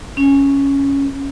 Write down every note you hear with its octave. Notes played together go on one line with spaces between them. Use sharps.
C#4